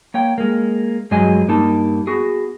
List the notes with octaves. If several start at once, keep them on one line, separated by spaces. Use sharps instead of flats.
A#3 C#5 G5
G#3 A#3
G2 F#3 G#3 G#4 D#5 G#5
G2 A#3 D#4 A5
B3 F#4 G#4